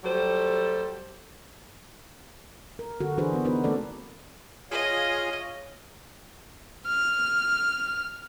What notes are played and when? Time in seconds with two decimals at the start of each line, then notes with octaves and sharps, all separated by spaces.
0.03 F#3 G3 A3 A4 C5
2.79 A#4
3.00 D3 F#4 A4
3.18 E3 D4 F#4 G#4 B4 C5
3.33 B3 B4
3.45 B3 D#4 F#4 A#4 B4
3.64 A3 C4 A4 D5
4.71 F4 G#4 C#5 D#5 F5
6.86 F6